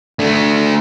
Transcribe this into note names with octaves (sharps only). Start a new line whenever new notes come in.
A3 D4